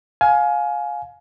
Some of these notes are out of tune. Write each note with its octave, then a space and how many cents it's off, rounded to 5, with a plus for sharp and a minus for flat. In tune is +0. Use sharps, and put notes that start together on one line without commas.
F5 +20 G#5 +20